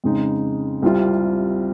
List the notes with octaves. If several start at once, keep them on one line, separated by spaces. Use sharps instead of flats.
F2 C#3 G#3 D#4
C2 C3 G3 C4 F4